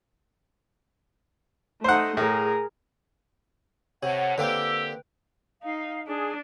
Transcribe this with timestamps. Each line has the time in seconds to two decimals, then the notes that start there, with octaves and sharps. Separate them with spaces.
1.84 A3 D#4 C5 F#5
2.17 A2 G#4 A#4
4.03 A2 C3 C#5 F#5
4.38 D3 A#3 C4 G4 B4 G5 E6
5.63 D#4 F5
6.07 D4 G#4